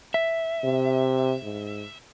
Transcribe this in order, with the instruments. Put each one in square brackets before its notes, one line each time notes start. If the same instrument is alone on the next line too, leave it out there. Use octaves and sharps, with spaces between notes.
[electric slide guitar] E5
[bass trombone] C3
G#2